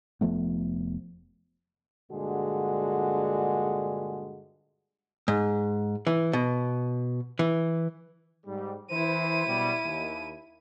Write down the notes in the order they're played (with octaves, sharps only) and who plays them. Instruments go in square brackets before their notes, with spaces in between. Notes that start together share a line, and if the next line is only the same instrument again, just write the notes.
[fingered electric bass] F1 F3 A3 B3
[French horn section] G2 A#2 D3 G#3 F#4 G#4
[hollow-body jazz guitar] G#2
E3
B2
E3
[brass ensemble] G#2 G3
[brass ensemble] E3 C5 [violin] E4 D#7
[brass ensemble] B2 F#3 G3
D#2